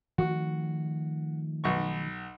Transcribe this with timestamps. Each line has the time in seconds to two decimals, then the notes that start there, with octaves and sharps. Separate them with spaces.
0.18 D#3 F3 A3 F#4
1.64 B1 C#6